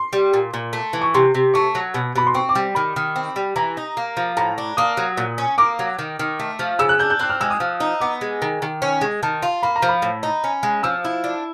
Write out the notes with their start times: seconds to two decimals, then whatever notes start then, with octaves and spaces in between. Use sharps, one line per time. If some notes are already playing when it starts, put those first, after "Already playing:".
Already playing: C6
0.13 G3
0.33 A#2
0.54 A#2
0.73 A3
0.93 E3
1.01 C#6
1.14 C3 C6
1.34 C3
1.54 A3 C#6
1.75 F#3
1.94 B2
2.15 B2 B5
2.27 C6
2.34 C4 C#6
2.49 D6
2.55 G3
2.75 D#3 B5
2.96 D#3
3.16 C4
3.36 G3
3.56 E3 A#5
3.77 D#4
3.97 A#3
4.17 F3
4.37 A2 A#5
4.58 D4
4.77 A#3 D#6
4.97 F#3
5.17 A#2
5.38 C#4
5.58 A#3 D6
5.79 F#3
5.99 D#3
6.19 D#3
6.40 A3
6.59 F3
6.79 C#3 E6
6.89 F#6
6.99 D4 G6
7.10 G6
7.19 C4 F#6
7.30 F6
7.40 G#3 E6
7.50 D#6
7.60 F3
7.80 D#4
8.01 B3 D6
8.21 G#3
8.42 D#3
8.62 D#3
8.82 C#4
9.01 G#3
9.23 D#3 A5
9.42 F4
9.63 A#3 B5
9.76 A#5
9.82 F3
9.89 B5
10.02 A2
10.23 D#4
10.44 C#4
10.63 G#3
10.83 F3 E6
11.05 E4
11.24 D4